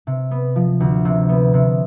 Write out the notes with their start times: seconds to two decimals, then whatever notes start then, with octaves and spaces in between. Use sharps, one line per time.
0.07 C3
0.31 B3
0.56 F3
0.80 D2
1.05 C3
1.29 B3
1.54 C3